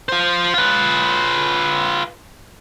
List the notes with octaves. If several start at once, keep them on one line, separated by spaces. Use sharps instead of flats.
F4 C5
F4 B4